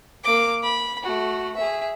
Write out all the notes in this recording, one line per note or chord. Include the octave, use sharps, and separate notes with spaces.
A#3 D6
B5
A3 F#4
G#4 E5